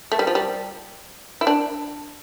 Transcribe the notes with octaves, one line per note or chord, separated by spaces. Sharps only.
A3
G3
F3
G3
E4
D4